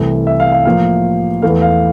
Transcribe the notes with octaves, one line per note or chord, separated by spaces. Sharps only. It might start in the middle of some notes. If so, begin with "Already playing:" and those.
Already playing: C2 C3 E3 A3
E5
F5
F5
A2 F3 A#3 F5
E2 E3 A3 F5
F5